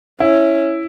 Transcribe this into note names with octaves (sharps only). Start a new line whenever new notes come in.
C#4 E4